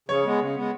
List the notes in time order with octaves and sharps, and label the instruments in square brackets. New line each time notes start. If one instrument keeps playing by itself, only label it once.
[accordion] C#3 [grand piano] C#5
[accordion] G#3 B3
C#3
G#3 B3